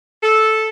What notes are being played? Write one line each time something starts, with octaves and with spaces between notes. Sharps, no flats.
A4